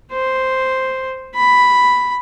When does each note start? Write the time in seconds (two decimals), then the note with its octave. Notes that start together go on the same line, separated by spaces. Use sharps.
0.12 C5
1.35 B5